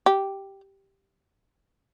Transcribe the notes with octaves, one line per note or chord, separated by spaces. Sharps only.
G4